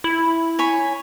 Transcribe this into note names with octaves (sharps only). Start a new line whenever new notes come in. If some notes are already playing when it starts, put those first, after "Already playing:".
E4
C#5 G#5 B5